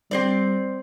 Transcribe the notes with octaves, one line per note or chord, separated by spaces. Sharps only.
G3 C4 C5 D5